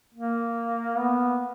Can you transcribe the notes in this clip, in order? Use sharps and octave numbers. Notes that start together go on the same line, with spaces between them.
A#3
B3